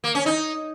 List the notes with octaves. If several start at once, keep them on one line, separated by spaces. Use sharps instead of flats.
A#3
C#4
D#4